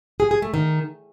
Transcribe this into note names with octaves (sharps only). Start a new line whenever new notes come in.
G#4
G#4
A3
D#3